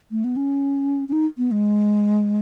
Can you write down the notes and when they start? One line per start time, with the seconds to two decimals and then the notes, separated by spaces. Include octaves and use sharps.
0.11 A3
0.24 B3
0.36 C#4
1.09 C#4
1.13 D#4
1.38 B3
1.51 G#3